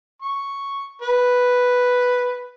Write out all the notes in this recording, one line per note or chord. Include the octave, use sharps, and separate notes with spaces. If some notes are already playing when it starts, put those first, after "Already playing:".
C#6
B4